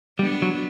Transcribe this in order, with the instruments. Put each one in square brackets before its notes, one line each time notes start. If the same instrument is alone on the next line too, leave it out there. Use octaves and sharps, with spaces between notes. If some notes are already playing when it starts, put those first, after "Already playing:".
[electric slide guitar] G3 [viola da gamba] B3 D4
[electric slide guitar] F#3